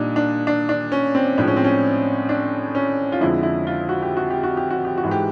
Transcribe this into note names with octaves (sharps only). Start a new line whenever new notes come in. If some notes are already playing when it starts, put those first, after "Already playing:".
Already playing: A#2 G3 D4 D#4
D4
D4
D4
C#4
C4
A2 F3 G#3 D4
C#4
C4
C#4
D4
C#4
F4
F2 D3 F3 G#3 E4
E4
F4
F#4
G4
F#4
G4
F#4
G4
F#4
G4
F#4
G#2 E3 G#3
G4